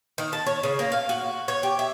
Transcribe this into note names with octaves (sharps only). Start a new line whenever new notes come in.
D#3
A5
C#5
C#3
A#3
F5
F#4
C#5
G4
E5